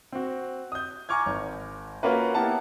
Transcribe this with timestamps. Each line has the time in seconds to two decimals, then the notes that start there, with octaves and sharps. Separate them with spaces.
0.12 C4 F#4
0.72 D#6 G6
1.09 G#5 A#5 C#6 D6 F6 G#6
1.26 G#1
2.03 A#3 C#4 F4 F#4 A#4 B4
2.35 A#3 B3 E4 G4 F#5 A5